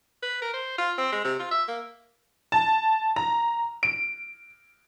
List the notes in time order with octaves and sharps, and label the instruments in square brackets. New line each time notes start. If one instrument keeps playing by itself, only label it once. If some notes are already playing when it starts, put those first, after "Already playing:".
[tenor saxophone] B4
A#4
C5
F4
C4
G#3
C3
F4
E5
A#3
[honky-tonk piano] A5
A#5
D7